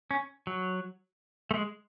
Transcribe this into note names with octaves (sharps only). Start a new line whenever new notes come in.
C#4
F#3
A3
G#3